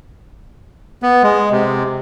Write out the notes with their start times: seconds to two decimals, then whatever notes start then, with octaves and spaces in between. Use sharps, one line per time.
1.03 B3
1.23 G#3
1.51 C3